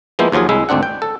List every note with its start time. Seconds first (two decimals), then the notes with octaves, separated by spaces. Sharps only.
0.19 F3 G#3 A#3 B3 E4 C5
0.32 D#2 F3 F#3 F4 G#4
0.49 C2 G#3 E4 E5
0.69 G#1 D2 C4 D4 F#5
0.83 G5
1.02 A4